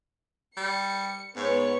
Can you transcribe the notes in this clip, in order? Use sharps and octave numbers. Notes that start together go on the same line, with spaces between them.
G3 C#7
G#2 B3 C#5 C#6